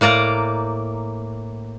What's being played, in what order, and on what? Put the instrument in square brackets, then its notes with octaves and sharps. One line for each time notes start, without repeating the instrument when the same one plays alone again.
[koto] A2 A#3 D5 A#5